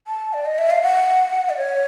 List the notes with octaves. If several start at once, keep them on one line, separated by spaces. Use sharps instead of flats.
A5
D5
D#5
E5
F5
F#5
D5
C#5